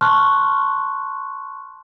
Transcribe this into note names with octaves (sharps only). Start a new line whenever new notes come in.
A5 C6 C#6 F6 F#6